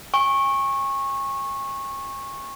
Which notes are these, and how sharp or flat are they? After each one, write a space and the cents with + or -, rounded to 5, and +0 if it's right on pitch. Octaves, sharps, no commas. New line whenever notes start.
G#5 -40 C#6 -20